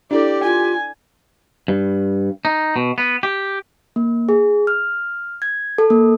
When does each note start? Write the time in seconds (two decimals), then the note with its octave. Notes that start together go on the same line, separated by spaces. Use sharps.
0.11 D4 E4 G4 A4 D5
0.44 F4 G#5
1.68 G2
2.45 D#4
2.76 B2
2.98 B3
3.23 G4
3.96 A#3
4.29 G#4
4.67 F6
5.42 G#6
5.78 A4
5.90 A#3